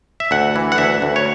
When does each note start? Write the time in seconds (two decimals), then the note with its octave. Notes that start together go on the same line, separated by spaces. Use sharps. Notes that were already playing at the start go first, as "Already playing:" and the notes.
0.20 E5
0.31 D2 F#5
0.56 E3
0.72 F#5
0.78 D2 E5
1.02 D2
1.16 C#5